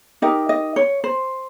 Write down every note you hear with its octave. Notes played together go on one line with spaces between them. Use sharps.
D#4 G4 A#4 D#5
D#5
C#5
C5